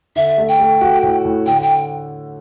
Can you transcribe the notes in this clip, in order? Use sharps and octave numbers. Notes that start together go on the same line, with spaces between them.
D3 E5
A3
G5
A3
F#4
A2
A2
D3 G5
G5